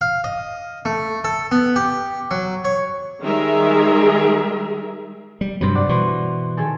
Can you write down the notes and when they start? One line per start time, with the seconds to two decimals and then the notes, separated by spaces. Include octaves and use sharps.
0.01 F5
0.24 D#5
0.85 A3
1.24 A4
1.51 B3
1.76 G4
2.31 F#3
2.65 C#5
3.22 D#3 G3 G#3 G#4 A#4 E5
5.41 G3
5.61 G2 C3 F#3 C5 B5
5.75 D5 F#5
5.89 B2 E3 C6 C#6
6.57 D#3 G#4 A4